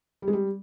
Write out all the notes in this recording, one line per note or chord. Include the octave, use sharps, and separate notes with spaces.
G3
G#3
G3